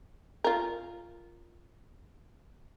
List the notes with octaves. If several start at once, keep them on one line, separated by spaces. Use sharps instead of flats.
F4 A#4